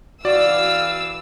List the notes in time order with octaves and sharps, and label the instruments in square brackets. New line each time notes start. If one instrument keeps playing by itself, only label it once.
[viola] E3 F5 [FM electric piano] F#4 [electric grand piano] D5 [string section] E6